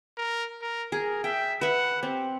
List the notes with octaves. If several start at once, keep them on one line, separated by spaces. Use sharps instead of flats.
A#4
A#4
G#4 A#4
E5 G5
B4 E5 F#5
C4 G4